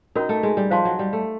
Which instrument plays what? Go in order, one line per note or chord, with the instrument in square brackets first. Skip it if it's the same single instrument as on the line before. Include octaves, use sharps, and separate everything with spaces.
[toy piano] C#4 F#4 A#4 [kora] D#4
[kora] A3
G#3
G3
[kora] F3 [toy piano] C5 F5 A5 C6
[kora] F#3
G3
A3